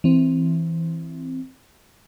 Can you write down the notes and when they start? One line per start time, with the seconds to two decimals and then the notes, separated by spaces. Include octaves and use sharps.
0.04 E3 C4